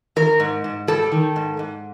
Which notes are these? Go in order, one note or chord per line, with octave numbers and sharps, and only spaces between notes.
D#3 A#4
G#2
G#2
G3 A4
D#3
G#2
G#2